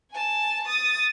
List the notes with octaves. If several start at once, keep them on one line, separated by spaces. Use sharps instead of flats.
G#5 A5
D#6 A6